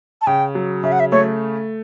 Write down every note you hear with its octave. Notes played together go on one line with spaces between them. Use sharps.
A5
C#3 G5
F#3
C#3 E5
F#5
E5
A3 C#5